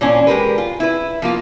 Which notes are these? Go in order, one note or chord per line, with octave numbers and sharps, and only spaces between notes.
A#2 E3 C#4 D4
G#3 G4 A#4 B4
F4
E4 B4
F3 A#3 F4